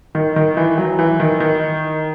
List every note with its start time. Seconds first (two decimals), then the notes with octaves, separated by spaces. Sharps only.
0.15 D#3
0.36 D#3
0.57 E3
0.78 F#3
0.99 E3
1.20 D#3
1.40 D#3